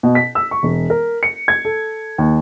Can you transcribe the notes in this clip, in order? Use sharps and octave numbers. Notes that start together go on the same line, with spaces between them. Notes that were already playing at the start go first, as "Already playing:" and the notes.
B2
B6
E6
C#6
E1
A#4
C#7
G#6
A4
D#2